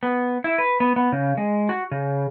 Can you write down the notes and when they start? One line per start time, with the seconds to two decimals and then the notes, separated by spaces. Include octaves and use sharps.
0.03 B3
0.44 E4
0.58 B4
0.80 B3
0.96 B3
1.12 C#3
1.37 G#3
1.69 F#4
1.91 C#3